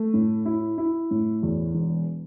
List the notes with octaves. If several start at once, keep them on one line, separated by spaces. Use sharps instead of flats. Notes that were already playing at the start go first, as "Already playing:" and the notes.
Already playing: A3
A2
E4
E4
A2
E2
E1